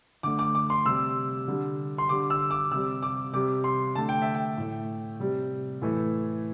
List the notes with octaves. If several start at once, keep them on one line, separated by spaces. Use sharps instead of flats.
D3 A3 D6
D6
D6
C6
C3 G3 E6
D3 G3
C6
D3 G3 D6
E6
D6
C3 G3 E6
D6
C3 G3 D6
C6
D3 A3 A5
G5
E5
G5
A2 A3
C3 G3
A2 E3 A3